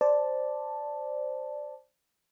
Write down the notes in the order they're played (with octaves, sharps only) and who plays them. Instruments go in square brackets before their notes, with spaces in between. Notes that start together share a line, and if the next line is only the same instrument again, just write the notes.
[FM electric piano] C5 D5 A5